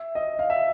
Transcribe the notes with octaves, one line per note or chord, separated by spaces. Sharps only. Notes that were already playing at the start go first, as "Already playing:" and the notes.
Already playing: E5
D#5
F5
E5